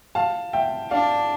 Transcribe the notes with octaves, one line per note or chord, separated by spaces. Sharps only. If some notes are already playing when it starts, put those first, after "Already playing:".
F5 A5
E5 G5
D4 D5 F5